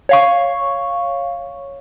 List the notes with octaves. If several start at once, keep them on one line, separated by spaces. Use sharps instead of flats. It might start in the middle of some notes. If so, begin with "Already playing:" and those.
C#5 F5 C#6